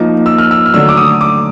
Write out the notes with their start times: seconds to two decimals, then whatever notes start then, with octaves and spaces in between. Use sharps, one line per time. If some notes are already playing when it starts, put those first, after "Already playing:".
Already playing: F3 A#3 D#4
0.26 E6
0.38 F6
0.51 E6
0.66 F6
0.74 D3 F#3 A3 E6
0.89 D6
0.97 D#6
1.21 D6